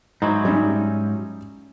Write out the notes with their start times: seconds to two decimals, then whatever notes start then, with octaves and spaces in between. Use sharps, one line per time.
0.22 G#2 F#3 D#4 E4 C5
0.45 G3 C#4 D#4 E5